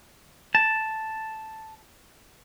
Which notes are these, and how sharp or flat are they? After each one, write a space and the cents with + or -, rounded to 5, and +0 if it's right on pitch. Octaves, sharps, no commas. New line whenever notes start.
A5 +0